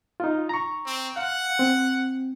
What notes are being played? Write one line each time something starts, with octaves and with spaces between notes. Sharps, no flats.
D#4 F4
A#5 C#6
C4
F5 F#5
C4